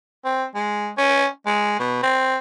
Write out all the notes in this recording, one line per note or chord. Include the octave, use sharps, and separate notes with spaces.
C4
G#3
C#4
G#3
B2
C4